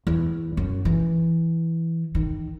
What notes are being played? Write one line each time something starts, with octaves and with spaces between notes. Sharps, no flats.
E2
F#2
E3
D#3